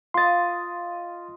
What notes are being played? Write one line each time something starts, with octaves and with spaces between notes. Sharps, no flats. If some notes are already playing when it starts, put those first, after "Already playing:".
F4 D#5 C6 A6